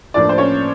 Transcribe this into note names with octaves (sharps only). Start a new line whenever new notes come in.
A2 F3 A#3 D4 D5
C5
C#4 C#5